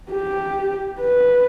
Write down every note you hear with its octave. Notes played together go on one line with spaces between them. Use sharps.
G4
B4